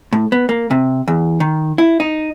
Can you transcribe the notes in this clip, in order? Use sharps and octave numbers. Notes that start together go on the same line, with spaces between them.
A2
B3
A#3
C3
E2
D#3
E4
D#4